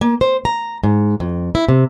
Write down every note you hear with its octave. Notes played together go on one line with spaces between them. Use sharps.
A#3
C5
A#5
G#2
F2
E4
C3